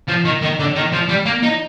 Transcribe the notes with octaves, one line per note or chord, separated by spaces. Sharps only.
F3
D#3
D#3
D3
D#3
F3
G3
A#3
D#4